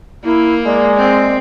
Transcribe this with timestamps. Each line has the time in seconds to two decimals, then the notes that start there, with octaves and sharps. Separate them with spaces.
0.24 A#3 E4
0.66 G#3 D5
0.97 C4